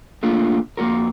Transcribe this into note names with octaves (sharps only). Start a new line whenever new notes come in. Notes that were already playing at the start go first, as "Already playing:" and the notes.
A3 A#3 D4 F4
F2 A#3 D4 F#4 A#4